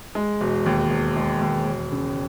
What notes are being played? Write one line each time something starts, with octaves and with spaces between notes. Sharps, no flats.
G#3
E1
D#2
E1
G#3
D#2
E1
C#3